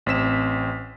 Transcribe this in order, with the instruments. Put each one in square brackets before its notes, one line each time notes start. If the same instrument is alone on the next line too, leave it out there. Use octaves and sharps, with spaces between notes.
[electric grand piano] A1 C4 B6 E7